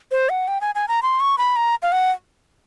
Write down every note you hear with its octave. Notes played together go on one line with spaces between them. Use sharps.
C5
F#5
G5
G#5
G#5
A#5
C6
C#6
B5
A#5
F5
F#5